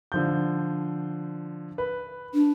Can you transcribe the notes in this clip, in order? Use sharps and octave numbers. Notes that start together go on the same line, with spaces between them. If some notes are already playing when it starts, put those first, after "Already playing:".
D3 F3 G6
B4
D4